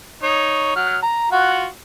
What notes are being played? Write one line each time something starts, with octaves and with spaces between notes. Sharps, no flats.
D#4 C#5
F#3 F6
A#5
F4 F#4 F#5